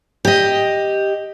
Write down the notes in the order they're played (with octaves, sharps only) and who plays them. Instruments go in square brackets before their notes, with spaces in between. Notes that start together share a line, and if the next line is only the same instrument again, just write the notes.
[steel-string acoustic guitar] G4 D#5